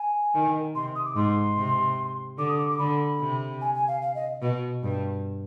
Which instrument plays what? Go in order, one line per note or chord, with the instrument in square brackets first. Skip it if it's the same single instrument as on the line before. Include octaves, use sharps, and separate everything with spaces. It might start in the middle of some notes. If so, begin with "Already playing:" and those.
Already playing: [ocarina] G#5
[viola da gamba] D#3
[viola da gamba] C3 [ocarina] C6
[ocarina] D#6
D6
[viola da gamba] G#2 [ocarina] C6
[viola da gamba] C3
[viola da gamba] D3 [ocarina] D6
[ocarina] D#6
D6
D6
[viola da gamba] D3 [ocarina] B5
[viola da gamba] C3
[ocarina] G#5
G#5
F5
F5
D#5
[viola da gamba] B2
G2